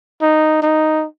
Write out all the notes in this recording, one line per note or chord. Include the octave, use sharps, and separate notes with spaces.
D#4
D#4